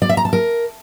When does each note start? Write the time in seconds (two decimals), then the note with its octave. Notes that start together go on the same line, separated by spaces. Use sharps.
0.02 D5
0.09 E5
0.17 A#5
0.25 A5
0.33 A#4